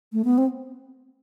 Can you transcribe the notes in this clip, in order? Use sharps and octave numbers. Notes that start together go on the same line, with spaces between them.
A3
B3
C4